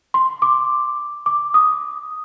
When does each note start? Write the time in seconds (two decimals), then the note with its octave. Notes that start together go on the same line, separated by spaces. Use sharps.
0.14 C6
0.42 D6
1.26 D6
1.54 D#6